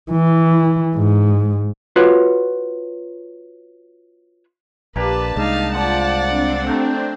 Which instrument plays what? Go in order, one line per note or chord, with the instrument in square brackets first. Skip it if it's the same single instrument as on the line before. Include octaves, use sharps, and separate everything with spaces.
[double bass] E3
G#2
[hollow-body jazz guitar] F4 F#4 B4 C#5
[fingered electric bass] A#1 [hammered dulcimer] A#3 D4 G4 [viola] B4 [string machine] A5
[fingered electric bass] C2 G#3 [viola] D#4 F5
[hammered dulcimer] F3 [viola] D5 F#5
[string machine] C4 D4
[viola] A3 [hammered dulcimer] G5 A#5